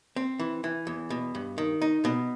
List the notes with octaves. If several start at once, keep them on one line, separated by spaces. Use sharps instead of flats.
C4
E3
E3
E2
B2
G2
D#3
D#4
B2